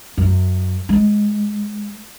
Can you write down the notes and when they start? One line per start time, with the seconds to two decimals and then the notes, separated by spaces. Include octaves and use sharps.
0.17 F#2
0.89 G#3